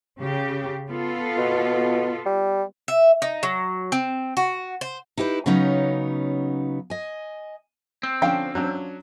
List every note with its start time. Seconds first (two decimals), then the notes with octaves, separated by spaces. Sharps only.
0.21 C#3 G4
0.90 B3 F4 A4
1.38 B2
2.26 G3
2.88 E5
3.22 D#4
3.43 F#3
3.92 C4
4.37 F#4
4.81 C5
5.17 D#4 E4 G4 G#4 B4
5.46 C#3 F#3 B3 C#4 D#4
6.90 D#5 G#5
8.03 C4
8.22 D3 F3 C#4 D4 F5 G5
8.55 F#3 C#4 D4